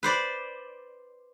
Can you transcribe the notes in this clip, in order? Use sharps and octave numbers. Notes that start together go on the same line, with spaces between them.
B4 C5 D5